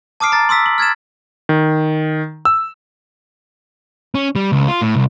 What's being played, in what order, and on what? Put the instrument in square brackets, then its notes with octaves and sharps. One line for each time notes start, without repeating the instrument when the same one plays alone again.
[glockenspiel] A5 D6 D#6 F6 C7 D7
A#5 A6 C7
C6 D#6 E6 B6
F#7
F6 G#6 A6 E7
[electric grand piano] D#3
E6
[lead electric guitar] C#4
G3
C#2
F4
A2
C2